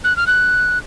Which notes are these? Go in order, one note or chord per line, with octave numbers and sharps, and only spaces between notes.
F#6
F6
F#6